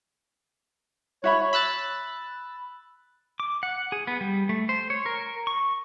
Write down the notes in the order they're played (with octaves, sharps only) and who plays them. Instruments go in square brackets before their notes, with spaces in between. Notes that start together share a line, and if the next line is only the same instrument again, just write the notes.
[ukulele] F#4 E5 B5 [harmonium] C#5
[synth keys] B5 E6 F#6 A6
[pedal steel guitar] D6
F#5
G#4
B3
G3
A3
C5
C#5
A#4
C#6